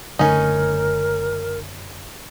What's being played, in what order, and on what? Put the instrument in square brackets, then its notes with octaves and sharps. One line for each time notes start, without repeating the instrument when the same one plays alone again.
[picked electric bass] F#1 D3 A3 [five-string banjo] C#4 D#4 [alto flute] A#4